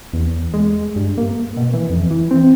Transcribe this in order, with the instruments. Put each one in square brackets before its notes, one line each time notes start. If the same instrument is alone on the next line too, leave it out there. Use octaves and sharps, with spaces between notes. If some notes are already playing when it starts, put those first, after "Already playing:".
[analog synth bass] E2
G#3
G2
A#3
B2
E3
F2
E3
C4